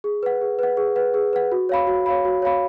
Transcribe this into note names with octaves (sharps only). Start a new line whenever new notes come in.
G#4
B4 F#5
G#4
B4 F#5
G#4
B4 F#5
G#4
B4 F#5
F#4
C#5 F5 B5
F#4
C#5 F5 B5
F#4
C#5 F5 B5